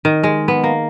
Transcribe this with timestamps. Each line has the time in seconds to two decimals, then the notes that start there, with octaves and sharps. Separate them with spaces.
0.05 D#3
0.23 G#3
0.48 B3
0.64 A#3